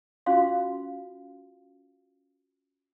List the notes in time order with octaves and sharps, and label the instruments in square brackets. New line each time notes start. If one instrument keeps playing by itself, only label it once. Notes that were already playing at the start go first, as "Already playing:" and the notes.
[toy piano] C#4 F4 F#4 F5 C6